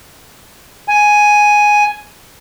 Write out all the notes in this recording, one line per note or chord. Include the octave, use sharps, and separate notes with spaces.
G#5